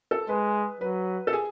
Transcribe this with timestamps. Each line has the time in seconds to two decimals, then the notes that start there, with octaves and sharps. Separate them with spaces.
0.11 A4
0.29 G#3 B4
0.81 F#3 B4
1.27 A4
1.33 G#4